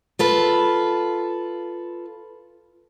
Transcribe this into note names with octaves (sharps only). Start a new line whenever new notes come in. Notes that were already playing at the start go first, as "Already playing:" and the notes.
F4 A4 B4